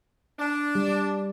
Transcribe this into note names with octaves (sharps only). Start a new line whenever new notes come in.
D4
G3